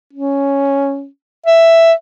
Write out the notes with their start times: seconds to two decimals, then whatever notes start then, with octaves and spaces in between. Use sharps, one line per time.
0.14 C#4
1.46 E5